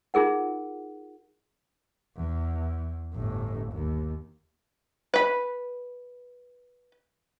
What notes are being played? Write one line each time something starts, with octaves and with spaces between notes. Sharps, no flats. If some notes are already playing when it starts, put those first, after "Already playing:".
D#4 F4 G#4 A#4 F#5
E2
G1 A2
D#2
B4 B5